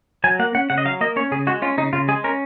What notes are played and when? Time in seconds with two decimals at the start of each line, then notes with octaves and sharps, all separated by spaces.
0.24 F#3 G#5
0.39 A#3 F#5
0.55 C#4 F#5
0.70 C#3 F#5
0.78 D#5
0.85 F#3 F5
1.01 A#3 D#5
1.16 C#4 C#5
1.32 C#3 G#4
1.47 G#3 F#4
1.62 C#4 F4
1.78 C#3 D#4
1.93 C#3 F4
2.08 G#3 G#4
2.24 C#4 A#4